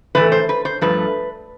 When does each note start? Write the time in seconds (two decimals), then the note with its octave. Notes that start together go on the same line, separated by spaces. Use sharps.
0.15 A2 E3 A3 B4
0.32 C5
0.49 B4
0.65 C5
0.81 G2 F3 A3 B4